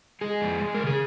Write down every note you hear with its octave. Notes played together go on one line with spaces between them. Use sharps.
G#3 G#4
F2
G#3
C#3 A#4
G#4